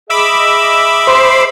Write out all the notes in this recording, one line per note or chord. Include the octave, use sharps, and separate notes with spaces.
G#4 D#5 E5 B5 D6 E6
C5 C6